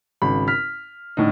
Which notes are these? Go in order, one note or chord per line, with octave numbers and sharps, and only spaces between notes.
G#1 C#3 B5
F6 B6
A2 D3 D#4